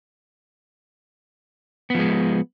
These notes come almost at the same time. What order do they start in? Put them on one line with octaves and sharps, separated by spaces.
B3 F3 G#3